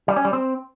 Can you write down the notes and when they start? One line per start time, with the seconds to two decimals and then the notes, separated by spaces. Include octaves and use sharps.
0.08 G3
0.16 C#4
0.25 G3
0.33 C4